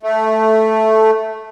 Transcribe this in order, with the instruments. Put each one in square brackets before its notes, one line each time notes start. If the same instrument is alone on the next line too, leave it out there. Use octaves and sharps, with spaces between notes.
[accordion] A3